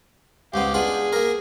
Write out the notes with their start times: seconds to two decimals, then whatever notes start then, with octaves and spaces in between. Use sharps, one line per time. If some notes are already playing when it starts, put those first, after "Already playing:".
0.54 C#2 G#2 B3 G4 F5
0.74 B3 D4 F4 G#4
1.13 A#3 A#4